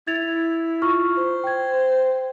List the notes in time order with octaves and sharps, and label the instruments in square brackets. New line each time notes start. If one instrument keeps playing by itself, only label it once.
[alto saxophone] E4 [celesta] G#6 A6 F7
[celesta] F4 C#6 F6
[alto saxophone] C5
[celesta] G5 G#6